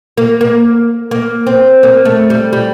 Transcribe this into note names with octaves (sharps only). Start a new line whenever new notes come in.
A#3
A#3
A#3
C4
A#3
A3
G3
G3